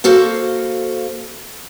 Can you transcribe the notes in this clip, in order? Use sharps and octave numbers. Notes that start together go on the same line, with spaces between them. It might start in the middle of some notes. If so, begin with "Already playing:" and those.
A#3 F#4 A4 C5 F5